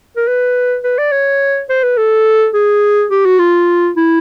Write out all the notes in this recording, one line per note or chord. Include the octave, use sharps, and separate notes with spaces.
A#4
B4
B4
D5
C#5
C5
B4
A4
G#4
G4
F#4
F4
E4